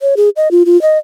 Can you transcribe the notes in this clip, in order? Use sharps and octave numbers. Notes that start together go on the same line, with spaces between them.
C#5
G#4
D#5
F4
F4
D#5